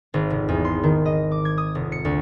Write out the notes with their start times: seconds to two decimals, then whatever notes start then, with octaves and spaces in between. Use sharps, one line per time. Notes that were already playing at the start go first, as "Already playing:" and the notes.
0.14 G#1
0.30 F1
0.49 E2
0.65 C6
0.83 D#3
1.06 D#5
1.31 D6
1.45 G#6
1.58 D#6
1.75 F1
1.92 C#7
2.05 D2